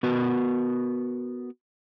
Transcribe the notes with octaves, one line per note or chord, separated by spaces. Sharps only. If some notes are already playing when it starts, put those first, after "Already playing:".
B3 F#4 A#4 B4